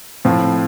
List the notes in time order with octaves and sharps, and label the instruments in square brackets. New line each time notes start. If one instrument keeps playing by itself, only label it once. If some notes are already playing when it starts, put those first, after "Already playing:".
[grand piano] A2 F3 C4